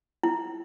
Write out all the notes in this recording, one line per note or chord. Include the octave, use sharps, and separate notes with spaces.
E4